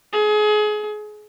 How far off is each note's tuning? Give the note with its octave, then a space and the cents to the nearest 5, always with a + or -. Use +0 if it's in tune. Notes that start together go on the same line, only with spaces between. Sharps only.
G#4 +30